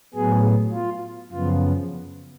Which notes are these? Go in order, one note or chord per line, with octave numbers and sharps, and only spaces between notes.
A2 F#3 B3 G#4
F4
F#2 C#3 F3 B3 F4